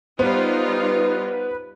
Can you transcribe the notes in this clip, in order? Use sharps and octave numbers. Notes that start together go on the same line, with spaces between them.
G3 B3 D#4 F4 B4 C5